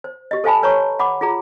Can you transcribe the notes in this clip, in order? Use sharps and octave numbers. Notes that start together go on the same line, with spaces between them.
C5
G4 D#5
A4 C5 F5 G#5 A5 B5
B4 C#5 A#5 C#6
F#5 B5 D6
F4 G#4 A#5